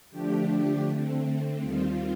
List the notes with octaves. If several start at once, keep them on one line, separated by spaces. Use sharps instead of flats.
D3 F3 A3 D4 G4
D3 A3 C4
D#2 D#3 G3 C4 F4